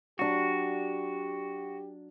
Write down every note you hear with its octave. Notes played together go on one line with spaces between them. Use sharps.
F#3 D4 F#4 G4